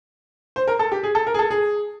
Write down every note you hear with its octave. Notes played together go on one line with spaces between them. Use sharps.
C5
A#4
A4
G4
G#4
A4
A#4
G#4
A4
G#4